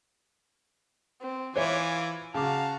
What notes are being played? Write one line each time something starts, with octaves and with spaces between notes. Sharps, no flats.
C4
E3 F4 C5 C#5 E5 G#5 D6
C#3 F#4 F5 A5 A#5 D6